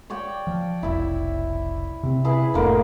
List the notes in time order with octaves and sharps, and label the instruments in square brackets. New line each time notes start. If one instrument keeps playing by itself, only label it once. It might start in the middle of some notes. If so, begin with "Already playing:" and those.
[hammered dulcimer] C#5 D5 G5
[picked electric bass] F3
[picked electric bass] F1 B1 [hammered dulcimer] E4 E5
[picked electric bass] C3 C4
[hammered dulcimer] E4 G#4 B4
[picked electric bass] F1 A2 [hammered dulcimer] D3 A#3